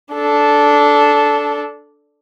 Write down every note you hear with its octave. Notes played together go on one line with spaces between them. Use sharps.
D4 A4